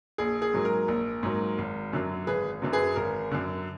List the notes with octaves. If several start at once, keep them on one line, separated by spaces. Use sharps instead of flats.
A#1 G#4
G#4
G#2 F#3 A#3
A#4
A#1
G#2 F#3 A#3
G#1
F#2 D3 F#3
G#1 G#4 B4
F#2 D3 F#3
G#4 B4
G#1 A#4
F#2 D3